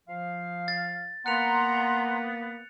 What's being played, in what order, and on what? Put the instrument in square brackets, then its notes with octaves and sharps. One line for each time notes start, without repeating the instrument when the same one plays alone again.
[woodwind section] F3 F5
[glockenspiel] A6
[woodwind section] A#3 B3 [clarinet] F#5 [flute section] A#5 C6 [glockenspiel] F#6 C#7 F7